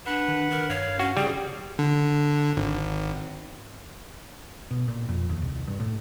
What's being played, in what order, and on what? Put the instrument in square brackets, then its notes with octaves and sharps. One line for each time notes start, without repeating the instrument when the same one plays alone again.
[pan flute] D4 [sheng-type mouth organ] B4 F#5
[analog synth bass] D#3
[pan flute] A#4
[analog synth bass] G2 [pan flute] C#5 [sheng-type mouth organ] F5
[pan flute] C#4 [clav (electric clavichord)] F#4
[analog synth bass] C#3 [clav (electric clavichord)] G3 [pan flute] G#4
[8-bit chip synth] D3
G#1
[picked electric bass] B2
A#2
F2
D#2
C2
G2
A2